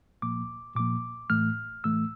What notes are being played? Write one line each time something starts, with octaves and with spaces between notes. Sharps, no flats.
A#2 F3 A#3 D6
A#2 F3 A#3 D6
A2 E3 A3 F6
A2 E3 A3 E6